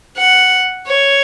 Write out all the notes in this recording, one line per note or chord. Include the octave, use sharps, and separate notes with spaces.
F#5
C#5